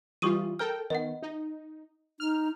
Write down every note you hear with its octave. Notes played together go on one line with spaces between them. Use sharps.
E3 G3 F4 C#6 D#6 D#7
A4 A#4 G5 F6
D#3 B3 D#5 F#5
D#4
D#4 F6